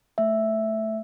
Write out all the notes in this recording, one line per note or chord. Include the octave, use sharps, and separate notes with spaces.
A3 E5